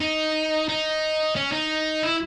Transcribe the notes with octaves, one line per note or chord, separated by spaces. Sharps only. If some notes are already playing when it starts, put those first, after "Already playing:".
D#4
D#4
C#4
D#4
E4